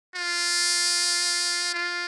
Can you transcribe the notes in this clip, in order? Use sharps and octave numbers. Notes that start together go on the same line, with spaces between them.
F4
F4